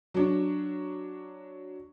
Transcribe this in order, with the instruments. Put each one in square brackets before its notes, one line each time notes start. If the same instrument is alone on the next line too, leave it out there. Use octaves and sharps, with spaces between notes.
[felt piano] F#3 D4